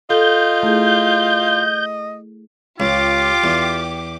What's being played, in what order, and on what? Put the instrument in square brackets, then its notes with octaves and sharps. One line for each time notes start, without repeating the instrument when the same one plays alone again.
[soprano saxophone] F4 [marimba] A4 [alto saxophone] D#5 [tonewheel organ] G6
[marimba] A3 E4 G#4
[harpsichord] C#2 [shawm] F4 [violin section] G4 D6
[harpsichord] E2